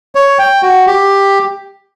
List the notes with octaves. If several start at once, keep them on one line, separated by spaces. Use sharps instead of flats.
C#5
G5
F#4
G4